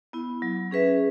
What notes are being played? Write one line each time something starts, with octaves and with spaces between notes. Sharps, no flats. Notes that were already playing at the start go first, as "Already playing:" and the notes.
B3 E4
F#3
C#4 G#4 B4 E5